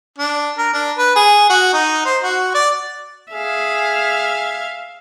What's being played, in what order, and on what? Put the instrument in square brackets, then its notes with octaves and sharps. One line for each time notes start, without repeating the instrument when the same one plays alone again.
[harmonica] D4
A#4
D4
B4
G#4
F#4
D#4
C5
F#4
D5
[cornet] G#4 [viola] E5 F5